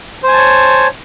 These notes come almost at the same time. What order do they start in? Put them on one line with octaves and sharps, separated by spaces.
C5 G#5 A5 C#5